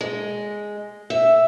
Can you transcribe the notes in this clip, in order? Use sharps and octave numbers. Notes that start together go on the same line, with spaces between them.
G#3
E5